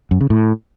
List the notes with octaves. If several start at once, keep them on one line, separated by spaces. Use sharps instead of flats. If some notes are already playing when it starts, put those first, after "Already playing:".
F#2
C#3
A2